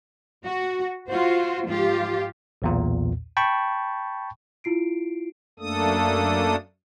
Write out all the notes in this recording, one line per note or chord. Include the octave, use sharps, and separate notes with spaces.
F#4
F4 F#4 C5
G#2 F3 F4 G4
B1 E2 A#2
G5 A5 B5 C#6
E4 F4 C7 D7
F#2 A3 A#3 D4 A4 D#6